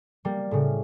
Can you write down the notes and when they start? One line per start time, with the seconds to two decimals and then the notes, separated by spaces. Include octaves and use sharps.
0.25 G3 A#3
0.51 A2 C#3